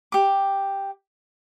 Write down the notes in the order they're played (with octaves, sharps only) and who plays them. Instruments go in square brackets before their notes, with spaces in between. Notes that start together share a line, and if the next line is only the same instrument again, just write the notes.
[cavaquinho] G4 D6